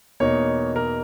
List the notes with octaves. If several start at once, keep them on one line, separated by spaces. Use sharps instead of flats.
E2 B2 A#3 D#4 C#5
A#4